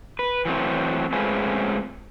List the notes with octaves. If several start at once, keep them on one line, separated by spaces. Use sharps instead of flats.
B4
E3 F#3 A3 C4
G#3 A3 C4 C#4 F4 B4